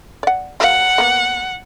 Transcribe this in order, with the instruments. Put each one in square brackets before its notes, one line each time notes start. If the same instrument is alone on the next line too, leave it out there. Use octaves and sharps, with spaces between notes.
[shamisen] D5 F#5
[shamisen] F#3 A#3 F5 [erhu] F#5
[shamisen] A#3 B3